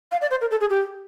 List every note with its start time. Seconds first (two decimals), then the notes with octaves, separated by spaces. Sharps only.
0.12 F5
0.21 D5
0.31 C5
0.41 A#4
0.51 A4
0.61 G#4
0.70 G4